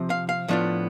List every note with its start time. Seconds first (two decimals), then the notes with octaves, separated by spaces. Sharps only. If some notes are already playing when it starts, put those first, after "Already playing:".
Already playing: C3 F3 C4
0.10 F5
0.29 F5
0.48 A2 F3 B3 D4 F4